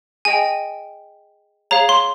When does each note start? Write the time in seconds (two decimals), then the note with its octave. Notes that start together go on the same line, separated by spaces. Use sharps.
0.25 G#4 D#5 G5 G#5
1.71 G#4 C#5 F5 A#5
1.89 C6